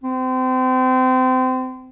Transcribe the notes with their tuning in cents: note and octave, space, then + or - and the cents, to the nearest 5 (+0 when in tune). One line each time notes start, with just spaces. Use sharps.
C4 -30